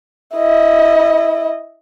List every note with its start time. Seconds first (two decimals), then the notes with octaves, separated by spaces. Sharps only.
0.36 E4 D#5